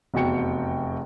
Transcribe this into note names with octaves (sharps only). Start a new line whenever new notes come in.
F1 E2 F#4 G5 C#7